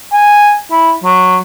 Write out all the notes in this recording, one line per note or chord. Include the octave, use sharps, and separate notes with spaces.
G#5
E4
F#3